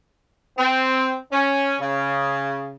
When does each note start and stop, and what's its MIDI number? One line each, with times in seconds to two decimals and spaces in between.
0.58 1.17 60
1.32 1.75 61
1.80 2.75 49